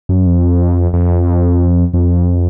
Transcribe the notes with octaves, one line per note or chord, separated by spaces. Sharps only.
F#2
F2
F2
F2